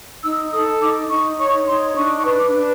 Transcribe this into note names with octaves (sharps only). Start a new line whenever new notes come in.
D#4 E6
A4 D#6
D#4 D6
D#4 C#6
C#5 C#6
D#4 C6
D4 C#6
C#6
B4
D6
D4